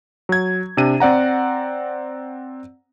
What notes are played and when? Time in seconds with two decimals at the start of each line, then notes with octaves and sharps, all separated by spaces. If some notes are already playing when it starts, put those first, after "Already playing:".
0.29 F#3 G#6
0.77 C3 D4 D#7
1.00 C4 D5 F#5 A#5